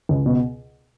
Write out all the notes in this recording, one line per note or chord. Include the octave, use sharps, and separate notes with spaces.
C#2
B2